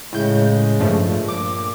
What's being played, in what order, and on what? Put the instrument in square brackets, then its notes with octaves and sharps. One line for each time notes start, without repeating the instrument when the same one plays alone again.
[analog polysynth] A2 G6 [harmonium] C#3 G#3
[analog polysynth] G2 F3 A3
[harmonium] A#2
[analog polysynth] D6